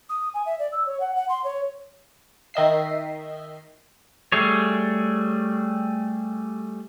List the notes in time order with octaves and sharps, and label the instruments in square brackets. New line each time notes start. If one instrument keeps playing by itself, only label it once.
[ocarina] D#6
G#5
E5
D5
E6
C#5
F#5
F#5
C6
C#5
[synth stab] D#3 D#5 E5 C7
[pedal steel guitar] G3 A3 G#4 C#5